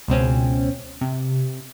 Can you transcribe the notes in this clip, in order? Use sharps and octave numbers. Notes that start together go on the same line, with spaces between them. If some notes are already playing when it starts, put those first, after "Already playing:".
C#2 B2 C4 C#4
C3